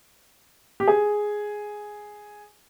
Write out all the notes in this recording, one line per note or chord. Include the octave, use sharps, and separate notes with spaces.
G4
G#4